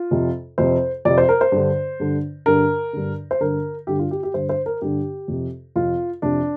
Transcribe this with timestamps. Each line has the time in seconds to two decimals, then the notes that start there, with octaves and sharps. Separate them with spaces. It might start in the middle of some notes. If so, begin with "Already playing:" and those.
Already playing: F4
0.11 F2 C3
0.58 F2 C3 C5
1.05 F2 C3 D5
1.18 C5
1.29 A#4
1.41 C5
1.52 G2 D3
2.00 G2 D3
2.46 G2 D3 A#4
2.93 G2 D3
3.31 C5
3.41 G2 D3 A#4
3.87 G2 D3 G4
3.99 F4
4.11 G4
4.23 G4
4.34 G2 D3 C5
4.49 C5
4.66 A#4
4.82 G2 D3 G4
5.28 F2 C3
5.76 F2 C3 F4
6.22 F2 C3 D4